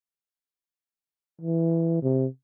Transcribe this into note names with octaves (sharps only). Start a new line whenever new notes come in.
E3
C3